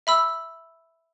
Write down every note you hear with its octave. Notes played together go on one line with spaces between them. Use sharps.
E5 B5 E6